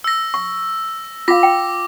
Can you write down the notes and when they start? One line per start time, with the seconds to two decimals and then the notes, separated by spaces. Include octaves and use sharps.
0.04 E6 A#6
0.34 C#6
1.28 F4 F5 D6 A#6
1.43 G5